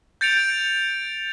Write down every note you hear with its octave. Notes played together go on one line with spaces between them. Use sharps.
G6 A6 C#7 D7 F7